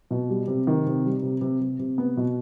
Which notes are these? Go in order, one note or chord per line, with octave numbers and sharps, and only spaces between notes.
B2
G3
C3
D#3
C3
G3
C3
C3
C3
C3
B3
B2